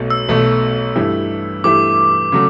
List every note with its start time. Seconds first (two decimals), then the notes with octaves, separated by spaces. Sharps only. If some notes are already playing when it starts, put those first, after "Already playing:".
Already playing: B1 B2 A3
0.10 E6
0.29 B1 B2 A3
0.95 G2 E3 A3 E4 G4
1.64 G2 E3 A3 E4 G4 D6
2.32 C#3 F#3 A3